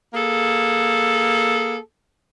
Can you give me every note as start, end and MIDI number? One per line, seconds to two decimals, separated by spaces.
0.14 1.77 58
0.14 1.77 68
0.14 1.77 69